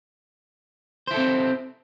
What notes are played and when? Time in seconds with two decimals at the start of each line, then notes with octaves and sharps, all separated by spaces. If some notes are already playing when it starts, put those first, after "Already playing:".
1.07 C5
1.11 E4
1.14 A4
1.17 C4